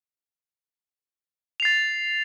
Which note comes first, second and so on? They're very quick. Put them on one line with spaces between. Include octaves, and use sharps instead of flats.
F7 C7 A6